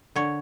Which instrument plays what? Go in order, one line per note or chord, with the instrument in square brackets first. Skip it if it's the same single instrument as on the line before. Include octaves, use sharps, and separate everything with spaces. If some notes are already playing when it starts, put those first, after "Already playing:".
[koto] D3 C#5